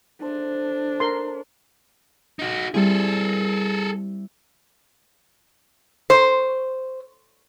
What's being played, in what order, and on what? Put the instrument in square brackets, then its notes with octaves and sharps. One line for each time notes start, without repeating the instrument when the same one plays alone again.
[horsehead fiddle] D4 [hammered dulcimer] A4 C5 E5
[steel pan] A#4 C6
[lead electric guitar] D#4 F#4
[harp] G3 C4 E4 [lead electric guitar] G#4 A4
[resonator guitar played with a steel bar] C5